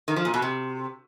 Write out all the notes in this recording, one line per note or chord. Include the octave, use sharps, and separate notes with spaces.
D#3
F3
A#2
B2
C3